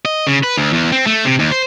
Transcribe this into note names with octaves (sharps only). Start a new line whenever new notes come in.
D#5
C#3
B4
D2
E2
C4
A3
C3
D#2
C5